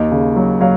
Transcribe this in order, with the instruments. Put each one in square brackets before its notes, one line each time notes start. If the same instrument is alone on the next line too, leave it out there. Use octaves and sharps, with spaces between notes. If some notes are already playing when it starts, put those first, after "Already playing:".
Already playing: [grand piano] D#2 D#5
C#3
F#3
F#3 F5